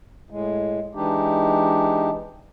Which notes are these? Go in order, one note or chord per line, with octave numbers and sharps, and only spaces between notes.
A2 G#3
E3 G#3 D4 D#4 G4